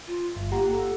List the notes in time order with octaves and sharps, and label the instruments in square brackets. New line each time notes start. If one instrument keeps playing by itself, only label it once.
[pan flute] F4
[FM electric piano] G1
[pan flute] A#3 [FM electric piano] G4 F#5 A#5
[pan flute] A4